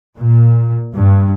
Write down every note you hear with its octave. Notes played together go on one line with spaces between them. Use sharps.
A#2
G2